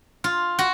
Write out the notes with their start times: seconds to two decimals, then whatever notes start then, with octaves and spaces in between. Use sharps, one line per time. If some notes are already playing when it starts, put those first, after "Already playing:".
0.24 F4
0.59 F#4